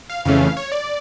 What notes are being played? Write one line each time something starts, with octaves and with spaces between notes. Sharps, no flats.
F5
F2 C#3 E3 A3 C#4 F5
C#5
D5